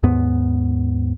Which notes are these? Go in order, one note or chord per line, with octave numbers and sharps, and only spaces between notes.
D#2 G#2 B3